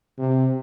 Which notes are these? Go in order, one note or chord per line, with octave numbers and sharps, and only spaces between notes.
C3